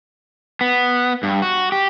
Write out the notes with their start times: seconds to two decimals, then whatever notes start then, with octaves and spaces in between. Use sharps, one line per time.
0.61 B3
1.23 G2
1.42 F#4
1.72 G4